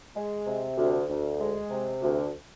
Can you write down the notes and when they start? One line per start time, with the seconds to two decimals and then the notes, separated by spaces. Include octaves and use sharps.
0.15 G#3
0.46 C3
0.77 D2
1.09 D2
1.40 G#3
1.70 C3
2.02 D2